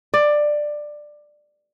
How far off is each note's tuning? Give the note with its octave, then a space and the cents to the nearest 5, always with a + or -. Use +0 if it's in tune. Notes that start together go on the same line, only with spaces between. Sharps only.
D5 +15